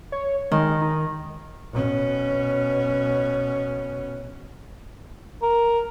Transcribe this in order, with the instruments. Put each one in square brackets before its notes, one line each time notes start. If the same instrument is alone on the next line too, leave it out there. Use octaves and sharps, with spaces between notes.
[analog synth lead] C#5
[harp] D#3 [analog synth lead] G#3
[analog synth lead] D#4
[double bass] B2 C#4
[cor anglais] A#4